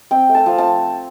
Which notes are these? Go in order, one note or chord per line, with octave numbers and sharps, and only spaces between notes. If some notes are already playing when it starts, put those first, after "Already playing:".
C4 G5
A3
A5
F3
A5